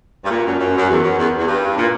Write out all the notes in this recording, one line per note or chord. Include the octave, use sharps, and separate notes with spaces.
G2
A#2
F#2
F#2
F#2
E2
F#2
E2
E2
G2
A#2